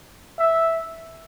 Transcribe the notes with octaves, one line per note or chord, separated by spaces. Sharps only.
E5